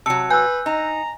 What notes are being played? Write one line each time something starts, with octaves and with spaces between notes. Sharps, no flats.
C3 F#3 A5 E6 C#7
B4 G#5 E6 F#6 G6
D#4 A#5